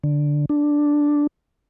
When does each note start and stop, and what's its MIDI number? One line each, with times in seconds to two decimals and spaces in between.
0.04 0.45 50
0.49 1.27 62